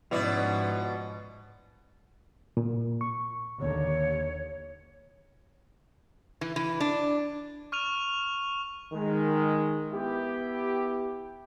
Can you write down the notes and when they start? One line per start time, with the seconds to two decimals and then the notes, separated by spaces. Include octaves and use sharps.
0.11 G#2 B2 F3 C#4 E4 D5
2.57 A#2
3.01 C#6
3.61 D#2 D3 C#5
6.41 E3
6.56 E3
6.80 D4
7.72 C#6 F6 D#7 F7
8.93 D#3 G#3
9.93 B3 E4 G4